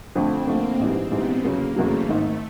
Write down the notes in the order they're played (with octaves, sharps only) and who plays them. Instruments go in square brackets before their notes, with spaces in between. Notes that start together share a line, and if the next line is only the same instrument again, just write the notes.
[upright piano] F2 D3 F3 A3 [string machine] C4
[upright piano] F2 D3 F3 A3 [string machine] A#3
[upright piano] A#1 G#2 E3 G3 [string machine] C4
[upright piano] A#1 G#2 E3 G3 [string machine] B3
[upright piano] F1 E2 C#3 F#3 [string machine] A#3
[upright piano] F1 E2 C#3 F#3 [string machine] A3
[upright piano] G#1 G#2 D#3 [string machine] A3